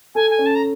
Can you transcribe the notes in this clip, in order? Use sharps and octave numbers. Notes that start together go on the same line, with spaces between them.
A4 G#5
G#5
C#4
A5
A#5